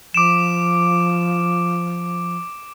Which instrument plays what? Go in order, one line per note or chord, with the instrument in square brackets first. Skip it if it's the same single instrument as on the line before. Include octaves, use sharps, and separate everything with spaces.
[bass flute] F3 [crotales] D6 D7 E7